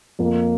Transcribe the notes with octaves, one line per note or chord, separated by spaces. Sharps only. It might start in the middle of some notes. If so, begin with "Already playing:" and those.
F2 A#3